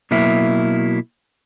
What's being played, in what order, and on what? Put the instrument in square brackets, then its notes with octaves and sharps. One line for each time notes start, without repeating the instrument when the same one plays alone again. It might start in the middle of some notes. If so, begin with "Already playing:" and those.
[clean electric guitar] B2 F#3 A#3 E4